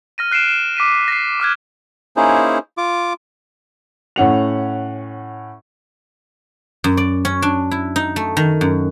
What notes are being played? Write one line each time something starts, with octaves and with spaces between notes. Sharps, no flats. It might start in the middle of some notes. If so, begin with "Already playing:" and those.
F6 A#6 D#7
F#6 C7 D7 E7
E7
D6 B6 D#7
A#6 C7
D6 F6 F#6 G#6
A#3 C#4 D#4 E4 G#4 C5
F4 D6
A2 C#4 F#5 F7
F#2
D5
C#4
D4
E4
D#4
A3
D#3
F#2